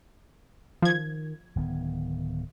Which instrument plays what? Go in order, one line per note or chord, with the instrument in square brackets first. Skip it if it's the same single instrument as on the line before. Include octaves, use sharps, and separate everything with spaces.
[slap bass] D#3 [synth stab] F3 G#6
[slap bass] D1 D#3 B3